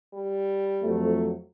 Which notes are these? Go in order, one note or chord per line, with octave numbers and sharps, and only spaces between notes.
G3
F2 F#3 A3